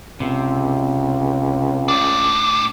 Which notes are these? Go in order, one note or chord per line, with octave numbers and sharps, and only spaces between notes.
C#2 C3
A2 D4